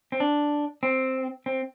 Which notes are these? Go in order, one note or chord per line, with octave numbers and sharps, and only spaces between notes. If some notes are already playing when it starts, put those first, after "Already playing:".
C4
D4
C4
C4